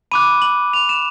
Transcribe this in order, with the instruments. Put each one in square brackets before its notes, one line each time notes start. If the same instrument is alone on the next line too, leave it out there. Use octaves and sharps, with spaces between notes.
[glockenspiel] B5 D6 F#6 D#7
F#7
F7
E7